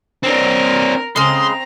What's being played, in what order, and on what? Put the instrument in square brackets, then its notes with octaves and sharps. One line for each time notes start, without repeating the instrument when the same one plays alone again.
[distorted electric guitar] C4 D4 [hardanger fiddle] A#4
[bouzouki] C#3 G#3 [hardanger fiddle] C4 A#5 [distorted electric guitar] C6